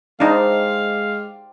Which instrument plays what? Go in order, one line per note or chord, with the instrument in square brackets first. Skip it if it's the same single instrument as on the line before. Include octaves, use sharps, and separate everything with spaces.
[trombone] G#3 [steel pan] D4 D#4 [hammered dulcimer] G4 C5 D5 [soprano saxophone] F5